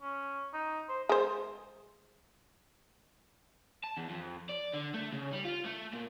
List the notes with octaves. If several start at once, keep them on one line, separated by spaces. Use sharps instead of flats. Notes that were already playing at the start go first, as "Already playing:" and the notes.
C#4
D#4
C5
G#3 C5
A5
E2
F2
D5
D3
A3
C#3
G3
F4
A3
A#2